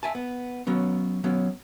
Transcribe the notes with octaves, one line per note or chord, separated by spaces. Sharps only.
E5 G#5 A5
B3
F#3 B3 C#4
F#3 B3 C#4